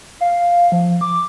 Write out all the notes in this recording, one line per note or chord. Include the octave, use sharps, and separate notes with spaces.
F5
F3
D6